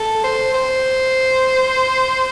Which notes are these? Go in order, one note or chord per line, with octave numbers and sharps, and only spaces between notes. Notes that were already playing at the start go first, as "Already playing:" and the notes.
Already playing: A4
C5
C5